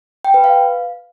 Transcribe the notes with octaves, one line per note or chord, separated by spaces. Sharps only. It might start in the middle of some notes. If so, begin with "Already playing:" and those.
G5
B4
F5